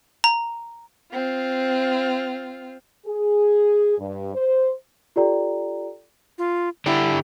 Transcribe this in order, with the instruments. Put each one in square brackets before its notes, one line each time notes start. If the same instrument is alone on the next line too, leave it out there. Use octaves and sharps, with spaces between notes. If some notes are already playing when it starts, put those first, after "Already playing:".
[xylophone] A#5
[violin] C4 F4
[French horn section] G#4
G2
C5
[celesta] F4 G4 A4 D5 G5 A#5
[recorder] F4
[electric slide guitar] D3 D4 G4 [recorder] E4